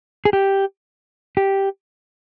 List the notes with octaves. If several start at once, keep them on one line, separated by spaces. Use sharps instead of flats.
G#4
G4
G4